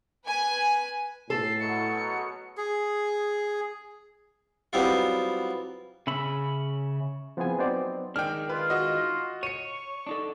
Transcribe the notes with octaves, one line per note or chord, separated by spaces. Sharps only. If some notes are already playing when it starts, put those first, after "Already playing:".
B4 G#5
A2 A4 C7
B2 F#3 C#7
G#4
F#3 G3 B3 C4 E4 F4
C#3 C#4 E5 B5
F3 B3 C4 E4 G#4 G#5
F#3 B3 C4 D#4 C5 D5
D#3 G#3 D4 G5 F6
F4 B4
F#4 D#5
C#5 C#6 C#7 D#7
D4 D#4 A4